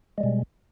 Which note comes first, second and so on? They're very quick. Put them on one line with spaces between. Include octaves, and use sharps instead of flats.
G#3 G3 B2